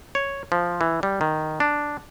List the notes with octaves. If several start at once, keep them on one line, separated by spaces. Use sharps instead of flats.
C#5
F3
E3
G3
D#3
D4